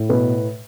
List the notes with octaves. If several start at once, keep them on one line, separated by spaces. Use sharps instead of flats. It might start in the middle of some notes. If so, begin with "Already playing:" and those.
Already playing: A2
B2 B4